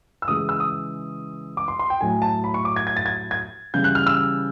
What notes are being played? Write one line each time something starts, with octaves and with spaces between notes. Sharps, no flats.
E6
C#3 E3 G#3 D#6
E6
D#6
D6
C6
C6
G5
A2 F#3 A3 G#5
A5
B5
C#6
D6
G#6
G#6
A6
G#6
G#6
C#3 E3 G3 G6
F#6
F6
E6